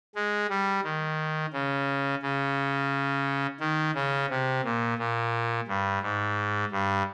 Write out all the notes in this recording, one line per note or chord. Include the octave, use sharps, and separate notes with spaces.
G#3
G3
D#3
C#3
C#3
D#3
C#3
C3
A#2
A#2
G2
G#2
G2